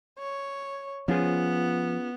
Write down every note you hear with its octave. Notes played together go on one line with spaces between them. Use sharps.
C#5
F3 B3 C#4 F4 G#4